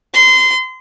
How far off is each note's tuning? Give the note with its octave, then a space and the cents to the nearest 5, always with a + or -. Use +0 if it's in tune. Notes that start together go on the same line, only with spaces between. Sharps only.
C6 -25